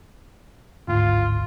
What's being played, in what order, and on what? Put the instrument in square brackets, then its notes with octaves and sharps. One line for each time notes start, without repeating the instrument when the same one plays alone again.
[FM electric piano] G#1 D2 A2 [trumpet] F4